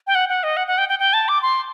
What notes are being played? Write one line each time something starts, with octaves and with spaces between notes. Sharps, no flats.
G5
F#5
F#5
D#5
F#5
F#5
G5
G5
G5
A5
D6
C6